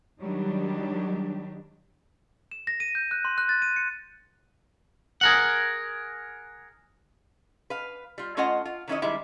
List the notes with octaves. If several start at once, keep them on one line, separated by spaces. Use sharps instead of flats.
D#3 F#3 G3 D4 G4
E7
A#6
D#7
G6
F#6
C6
F#6
A6
D#7
C#7
G#4 A#4 F#5
B4 F5
G3 F4
A3 C#4 F4 D#5 F#5 G#5
F4
D#3 F#3 C#4 E4 C#5 D#5
D#3 G3 G#3 E4